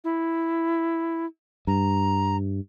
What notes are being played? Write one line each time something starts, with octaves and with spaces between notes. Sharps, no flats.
E4
G2 A#5